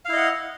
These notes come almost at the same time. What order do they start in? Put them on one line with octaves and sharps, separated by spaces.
F5 E4 D#5 F#5